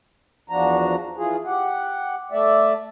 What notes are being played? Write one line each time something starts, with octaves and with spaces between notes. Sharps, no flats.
E2 F3 D4 F#4 A#5
E3 F4 G#4
G4 F#5
A3 D5 E5